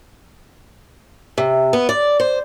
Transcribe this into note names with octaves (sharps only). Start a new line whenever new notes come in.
C3
B3
D5
C5